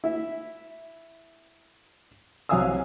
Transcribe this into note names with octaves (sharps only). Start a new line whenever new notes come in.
E4 E5
C2 F#3 F5 G#5 D#6 E6